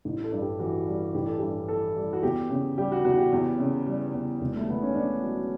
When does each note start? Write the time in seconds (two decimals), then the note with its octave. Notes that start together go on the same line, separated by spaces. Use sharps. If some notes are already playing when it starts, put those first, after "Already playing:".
0.05 A1
0.24 A4
0.32 G2
0.42 G4
0.59 E3 F#4
0.87 G3
1.15 A1 G4
1.26 A4
1.39 G2 G4
1.69 E3 A4
1.96 G3
2.13 F#4
2.23 E2 G4
2.50 C#3
2.78 G3 G4
2.92 F#4
3.05 E2 F#4
3.18 G4
3.32 E2
3.59 C#3
3.86 G3
4.14 E2
4.41 E1
4.56 A3
4.68 E2 B3
4.83 C#4
4.95 D3 D4
5.23 F#3